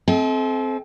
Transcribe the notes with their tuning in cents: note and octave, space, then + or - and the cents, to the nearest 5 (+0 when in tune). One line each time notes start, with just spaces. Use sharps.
C4 +0 A4 -35 D#5 +45